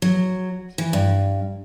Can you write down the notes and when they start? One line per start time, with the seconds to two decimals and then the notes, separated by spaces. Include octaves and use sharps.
0.02 F#3
0.78 E3
0.93 G2